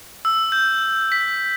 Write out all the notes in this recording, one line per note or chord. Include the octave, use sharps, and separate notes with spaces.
E6
G6
B6